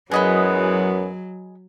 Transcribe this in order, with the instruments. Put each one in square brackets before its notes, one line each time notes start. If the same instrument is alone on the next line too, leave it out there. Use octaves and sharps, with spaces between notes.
[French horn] F#2 [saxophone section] E3 G#3 B3 [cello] F#3 [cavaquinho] G#4 D#5 B5